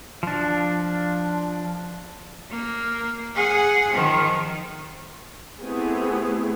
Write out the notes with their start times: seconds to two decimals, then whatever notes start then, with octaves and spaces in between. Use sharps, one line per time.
0.23 F3 D4
2.50 A#3
3.35 G#4 F#5
3.92 D#3 F3
5.62 A3 B3 C4 E4 G4 G#4